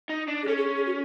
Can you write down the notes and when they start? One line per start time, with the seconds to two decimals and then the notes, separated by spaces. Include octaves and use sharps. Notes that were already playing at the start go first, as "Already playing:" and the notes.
0.09 D#4
0.28 D4
0.43 G#4
0.47 C#4 A4
0.57 G#4
0.77 G#4
0.87 F#4